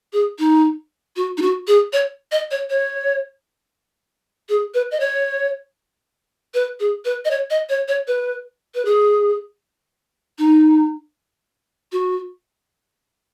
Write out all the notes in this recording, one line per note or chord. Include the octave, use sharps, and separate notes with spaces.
G#4
D#4
F#4
D#4
F#4
G#4
C#5
D#5
C#5
C#5
G#4
B4
D#5
C#5
B4
G#4
B4
D#5
C#5
D#5
C#5
C#5
B4
B4
G#4
D#4
F#4